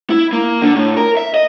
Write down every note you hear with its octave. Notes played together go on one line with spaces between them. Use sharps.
E4
A#3
D3
A2
A#4
E5
D#5